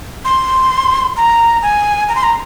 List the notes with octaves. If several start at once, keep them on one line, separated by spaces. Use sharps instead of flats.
C6
A#5
G#5
A#5
C6
A#5